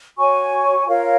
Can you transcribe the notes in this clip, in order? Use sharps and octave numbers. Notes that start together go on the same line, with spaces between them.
F#4 C#5 G#5 C#6
F4 A#4 C#5 F5